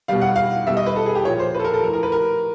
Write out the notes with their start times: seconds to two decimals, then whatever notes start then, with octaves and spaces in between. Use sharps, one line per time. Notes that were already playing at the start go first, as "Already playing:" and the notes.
0.08 B2 G3 F5
0.21 F#5
0.36 F5
0.67 B2 G3 E5
0.77 D#5
0.86 B4
0.96 A4
1.06 G#4
1.15 G4
1.25 A#2 C#5
1.29 F3
1.39 C5
1.54 B4
1.59 A4
1.65 A#4
1.73 A4
1.83 F3 A#4
1.87 A2
1.93 A#4
2.03 B4
2.12 A#4